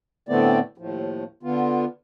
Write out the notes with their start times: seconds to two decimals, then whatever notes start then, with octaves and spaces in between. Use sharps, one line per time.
0.29 A2 D3 A3 B3 C4 D5
0.78 D#2 A2 F3
1.43 D3 B3 F4